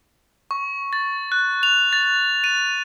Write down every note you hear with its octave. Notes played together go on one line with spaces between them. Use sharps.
C#6
A6
F#6
F7
A6
D#7